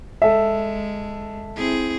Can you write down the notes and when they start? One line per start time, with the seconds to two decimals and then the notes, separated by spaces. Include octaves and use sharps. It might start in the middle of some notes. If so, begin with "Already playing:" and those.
0.22 G#3 A4 E5
1.56 C4 E4 G#4